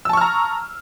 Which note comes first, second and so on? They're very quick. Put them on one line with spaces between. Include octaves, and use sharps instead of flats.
E6 A5 C#6 F6 A#5